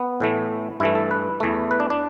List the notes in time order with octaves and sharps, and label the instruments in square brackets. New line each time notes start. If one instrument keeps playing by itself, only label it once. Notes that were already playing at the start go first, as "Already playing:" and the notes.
Already playing: [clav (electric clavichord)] B3
A2 E3 A3
G2 E3 A3 E4
A4
B4
E2 E3 A3
B4
D4
D4